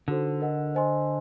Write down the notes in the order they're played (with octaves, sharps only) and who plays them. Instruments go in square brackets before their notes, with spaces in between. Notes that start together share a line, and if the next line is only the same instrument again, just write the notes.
[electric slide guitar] D3 [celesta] D#4 F#4 A4 C5
[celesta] A#4 D#5 F#5
C5 D#5 G#5 C6